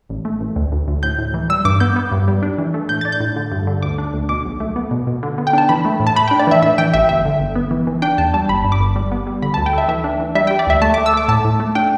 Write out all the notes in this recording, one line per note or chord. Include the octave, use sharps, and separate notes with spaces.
A1
A3
A1
D2
D2
D2
A2 G6
A2
E3
G3 E6
G2 D6
B3 G6
B3
G2
G3
D4
E3
A3
A2 G6
D4 A6
G6
A2
D3
G2
D3
D2 D6
D4
D2
B2 D6
B1
A3
B3
B2
B2
D3
B3
G5
D4 A5
E3 B5
A3
A2
A5
A3 B5
D4 G5
D5
E3 E5
A2 E5
E3 G5
A1 E5
G1 E5
D3
G1
B3
E3
E3
D4 G5
E2 A5
G3 A5
G1 B5
G2
D6
G1
G3
B3
G3
D3 B5
D2 A5
G5
A3 E5
E3 E5
D4
E3
G3 E5
G3 G5
D5
D2 E5
A3 A5
A3 D6
E6
A3 D6
A2 A5
A2
A3
D4 G5